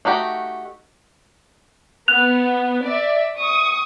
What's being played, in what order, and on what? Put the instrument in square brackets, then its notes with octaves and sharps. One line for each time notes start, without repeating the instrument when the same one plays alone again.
[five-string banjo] A3 D#4 F#4 G4
[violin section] B3 [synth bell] F#6 F7
[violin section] D5 E5
C#6 D#6